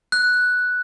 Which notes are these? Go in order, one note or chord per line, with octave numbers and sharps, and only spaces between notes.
F#6